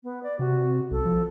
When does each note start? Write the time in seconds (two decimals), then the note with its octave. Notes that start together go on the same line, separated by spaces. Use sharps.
0.04 B3
0.23 D5
0.39 C3 F#4
0.91 B1 A4
1.05 F3